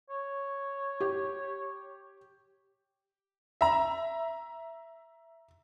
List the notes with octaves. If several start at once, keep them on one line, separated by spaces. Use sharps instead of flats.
C#5
G4
E5 A#5